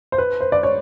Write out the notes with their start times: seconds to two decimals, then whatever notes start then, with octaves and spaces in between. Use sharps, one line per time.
0.12 C5
0.18 B4
0.41 C5
0.52 D5
0.63 C#5